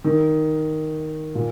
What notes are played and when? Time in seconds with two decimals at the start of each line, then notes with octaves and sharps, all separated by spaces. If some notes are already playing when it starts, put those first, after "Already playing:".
0.04 D#3
1.35 A#2